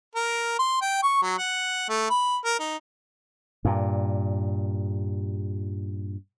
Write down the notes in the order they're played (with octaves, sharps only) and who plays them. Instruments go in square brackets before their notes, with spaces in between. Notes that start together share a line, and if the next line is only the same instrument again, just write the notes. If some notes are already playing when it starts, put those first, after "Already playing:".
[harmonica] A#4
C6
G5
C#6
F#3
F#5
A3
B5
A#4
D#4
[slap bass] G2 A#2